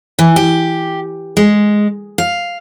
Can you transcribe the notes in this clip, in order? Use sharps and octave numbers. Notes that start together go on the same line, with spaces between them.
E3
G4
G#3
F5